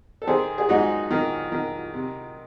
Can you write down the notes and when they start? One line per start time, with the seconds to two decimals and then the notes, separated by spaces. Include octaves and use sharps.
0.22 A4
0.27 D#3 G#4 C5
0.58 G#4
0.69 G#2 D#4 F#4
1.10 D#3
1.52 D#3
1.94 C3